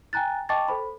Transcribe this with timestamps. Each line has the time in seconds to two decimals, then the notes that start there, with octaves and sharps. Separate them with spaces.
0.13 G5 G#5 A#5 F#6 A6
0.49 D#5 G5 A5 C#6 D6 A6
0.68 A4 C5 B5